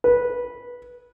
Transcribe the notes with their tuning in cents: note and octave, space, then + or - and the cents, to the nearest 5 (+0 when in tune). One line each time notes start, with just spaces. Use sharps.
B4 -15